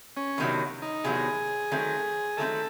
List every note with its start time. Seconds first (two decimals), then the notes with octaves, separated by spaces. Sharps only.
0.17 C#4
0.38 E2 C3 D#3 F#3
0.82 D#4
1.04 E2 C3 D#3 F#3 G#4
1.71 D#3 F#3 A3 C4
2.37 D#3 F#3 A3 C4 A4